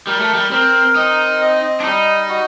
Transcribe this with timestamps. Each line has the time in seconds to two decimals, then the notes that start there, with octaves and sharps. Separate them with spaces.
0.07 G3 A#4
0.20 A3
0.34 G3
0.52 C4 A#4
0.95 C4 D#4
1.41 D#5
1.80 D4
1.84 G3 D#4
2.29 F#4